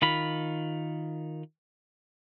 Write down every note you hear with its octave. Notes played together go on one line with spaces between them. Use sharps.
D#3 F4 B5